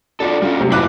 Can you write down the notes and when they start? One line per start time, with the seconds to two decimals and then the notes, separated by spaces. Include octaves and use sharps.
0.20 D4 F4 F#4 A4 D5
0.42 G3 C#4 F4
0.59 C3 F#3 A3
0.72 F#1 E4 F4 B4 D6 F#6